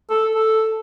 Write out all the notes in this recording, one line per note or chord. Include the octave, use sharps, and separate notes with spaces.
A4
A4